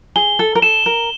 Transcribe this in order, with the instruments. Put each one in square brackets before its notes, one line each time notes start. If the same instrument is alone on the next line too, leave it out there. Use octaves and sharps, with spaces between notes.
[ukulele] G#4 [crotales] G7
[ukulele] A4
A#4
[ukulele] A4 [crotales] E7
[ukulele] A#4